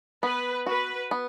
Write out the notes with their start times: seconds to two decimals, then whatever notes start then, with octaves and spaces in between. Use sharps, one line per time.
0.23 B3 B4
0.66 F#4 B4
1.11 B3